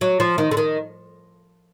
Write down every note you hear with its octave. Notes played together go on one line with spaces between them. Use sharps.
F#3
F3
D#3
D3
D#3